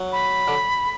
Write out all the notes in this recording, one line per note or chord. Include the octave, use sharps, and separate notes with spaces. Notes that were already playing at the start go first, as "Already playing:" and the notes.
Already playing: F#3
B5
D3